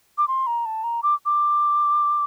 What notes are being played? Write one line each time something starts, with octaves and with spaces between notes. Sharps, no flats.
D6
C6
A#5
A5
A#5
D6
D6